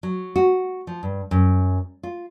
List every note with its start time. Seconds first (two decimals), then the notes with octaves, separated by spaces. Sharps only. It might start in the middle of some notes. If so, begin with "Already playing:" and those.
0.03 F#3
0.36 F#4
0.87 F3
1.03 G2
1.31 F#2
2.03 F4